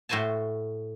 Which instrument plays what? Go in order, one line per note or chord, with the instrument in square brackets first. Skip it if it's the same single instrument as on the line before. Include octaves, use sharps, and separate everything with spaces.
[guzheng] A2 F#4 C5 G#5 A5